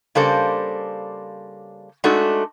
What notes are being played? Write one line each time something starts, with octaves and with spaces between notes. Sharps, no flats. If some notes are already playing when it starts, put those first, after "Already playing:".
C#3 G3 A#3 D4 A4 C5
G#3 A3 D4 D#4 F#4 A4